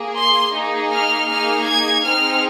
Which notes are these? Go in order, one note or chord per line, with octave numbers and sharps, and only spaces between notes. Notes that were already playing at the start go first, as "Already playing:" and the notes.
Already playing: A#3 G#4
C6
A#3 D#4 G#4
F6
A#3 D#4 G#4 F6
G#6
C4 D#4 G#4 F6